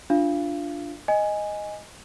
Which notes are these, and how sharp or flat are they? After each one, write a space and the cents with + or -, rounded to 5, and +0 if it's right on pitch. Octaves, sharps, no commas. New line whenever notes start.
D4 +0 F4 +0 F5 -25
D#5 +0 G#5 -5